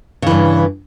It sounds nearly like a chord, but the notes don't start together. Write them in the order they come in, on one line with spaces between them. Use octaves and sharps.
C#3 E3 G2